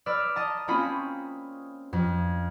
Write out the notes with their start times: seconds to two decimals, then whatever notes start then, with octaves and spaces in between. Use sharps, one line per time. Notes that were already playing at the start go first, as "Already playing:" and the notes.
0.06 B4 D5 E6 F6
0.36 D#5 A5 A#5
0.68 A#3 C4 C#4 F4 D#5 B5
1.93 F2